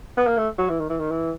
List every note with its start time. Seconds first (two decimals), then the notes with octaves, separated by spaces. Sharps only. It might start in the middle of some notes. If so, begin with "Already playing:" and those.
0.17 B3
0.27 A#3
0.37 A3
0.58 F#3
0.69 E3
0.80 D#3
0.89 E3
1.00 D#3
1.10 E3